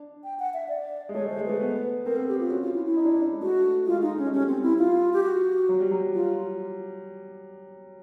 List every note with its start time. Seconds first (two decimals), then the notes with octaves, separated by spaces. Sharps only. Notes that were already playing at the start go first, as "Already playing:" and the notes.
Already playing: D4
0.24 G5
0.39 F#5
0.54 E5
0.69 D5
1.09 G#3
1.14 A3 C#5
1.26 G#3
1.30 C5
1.38 G#3
1.45 A3 B4
1.60 B3
2.05 C4 A#4
2.16 A4
2.28 G4
2.40 F4
2.50 C#4 F#4
2.62 F4
2.74 E4
2.85 E4
2.97 D#4
3.04 D4
3.12 C#4
3.20 D4
3.32 G#3
3.41 A3 F#4
3.86 G#3 F4
4.02 D#4
4.16 A3 C#4
4.25 G#3
4.32 G3 C#4
4.47 C4
4.63 E4
4.78 F4
5.13 G4
5.23 F#4
5.69 F#3
5.80 G3
5.91 F#3
6.14 F4